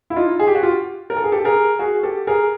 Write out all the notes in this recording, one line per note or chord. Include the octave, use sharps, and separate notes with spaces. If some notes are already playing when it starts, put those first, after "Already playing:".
E4
D#4 F4
G#4
G4
F#4
F4 G4
A#4
A4
G#4
G4 A4
G#4 A#4
F#4 G#4
G4 A4
G#4 A#4